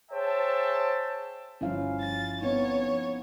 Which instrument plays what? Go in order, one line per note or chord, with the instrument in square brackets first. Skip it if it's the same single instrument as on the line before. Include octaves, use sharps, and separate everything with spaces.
[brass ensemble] G#4 C5 C#5 E5 G5 A5
[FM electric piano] G1 G2 F3 [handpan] C#4 E4 F5
[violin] A6
[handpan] B3 C4 D#4 [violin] C#5